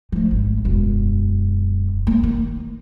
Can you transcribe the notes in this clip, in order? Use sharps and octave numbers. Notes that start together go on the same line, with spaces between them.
F3 A3
G#1
E1 F#2
A#3
D#3